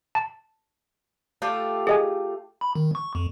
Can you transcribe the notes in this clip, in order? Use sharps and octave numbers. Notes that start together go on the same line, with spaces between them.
A5
A3 F4 G4
G#4 D#5 G#5
B5
D#3
C#6
F2